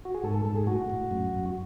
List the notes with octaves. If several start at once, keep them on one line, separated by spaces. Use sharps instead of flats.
F#4
G#4
G#2 A4
A4
G#2 A4
G#4
A2 F#4
A2
F#2
F#2